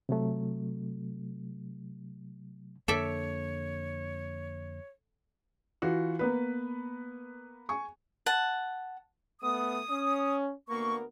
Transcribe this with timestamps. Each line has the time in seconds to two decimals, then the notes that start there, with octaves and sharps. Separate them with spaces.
0.09 C3 F#3 A3
2.88 F2 D3 A#3 A4 C#5 D5 E5
5.82 E3 F4 F#4
6.19 A#3 B3 B4
7.69 G#5 C#6
8.26 F#5 A5
9.41 A3 B3 D#6
9.90 C#4
10.69 D2 A#3 B3 A#4 C#6